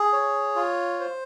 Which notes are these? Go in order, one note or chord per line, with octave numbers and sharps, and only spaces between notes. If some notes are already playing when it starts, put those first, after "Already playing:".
Already playing: G#4
C#5
F4
C5